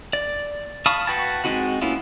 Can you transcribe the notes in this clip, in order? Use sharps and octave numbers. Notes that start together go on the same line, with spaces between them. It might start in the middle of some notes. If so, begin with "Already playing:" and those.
D5
F5 A5 B5 C#6 D#6
F#4 B4 G5 A5
G#3 C4 D#4 F#4 F#5
A#3 B3 C#4 E4 F4